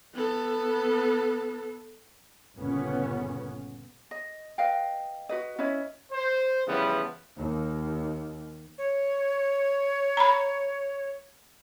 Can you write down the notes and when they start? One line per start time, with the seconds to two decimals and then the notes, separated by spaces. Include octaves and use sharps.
0.14 B3 A4
2.57 G1 A#2 C#3 B3 C#4
4.11 D#5
4.58 B4 D#5 F5 G5
5.29 F#4 B4 D#5
5.59 C#4 E4 B4 D#5
6.12 C5
6.67 C#3 E3 F3 G3 B3
7.37 D#2
8.78 C#5
10.17 A#5 B5